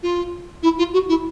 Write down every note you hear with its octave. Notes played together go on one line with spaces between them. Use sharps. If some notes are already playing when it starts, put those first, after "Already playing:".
F4
E4
F4
F#4
E4